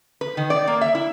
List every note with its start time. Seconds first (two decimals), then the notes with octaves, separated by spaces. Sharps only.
0.21 B4
0.37 D#3
0.50 D5
0.67 A#3
0.81 E5
0.95 E4